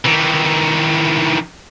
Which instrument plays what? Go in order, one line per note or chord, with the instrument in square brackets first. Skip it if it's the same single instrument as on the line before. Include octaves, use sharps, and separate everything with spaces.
[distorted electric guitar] D#3 E3